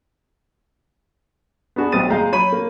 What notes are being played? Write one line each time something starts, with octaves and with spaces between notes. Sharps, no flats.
B3 D4 F#4 G#4
B1 G3 C4 D#6 A6 D#7
F#1 G#3 F5 A#5 G6
F#3 C#5 B5 D#7
A#3